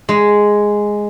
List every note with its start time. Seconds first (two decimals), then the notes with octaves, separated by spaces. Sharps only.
0.09 G#3